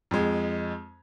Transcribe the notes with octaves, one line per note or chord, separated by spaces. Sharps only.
F2 G#3